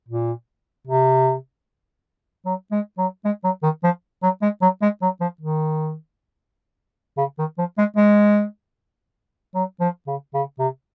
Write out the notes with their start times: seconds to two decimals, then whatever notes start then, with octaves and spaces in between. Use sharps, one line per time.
0.09 A#2
0.87 C3
2.46 F#3
2.72 G#3
2.98 F#3
3.25 G#3
3.44 F#3
3.63 D#3
3.84 F3
4.23 F#3
4.42 G#3
4.62 F#3
4.82 G#3
5.02 F#3
5.21 F3
5.41 D#3
7.18 C#3
7.39 D#3
7.58 F3
7.78 G#3
7.97 G#3
9.55 F#3
9.80 F3
10.07 C#3
10.34 C#3
10.59 C3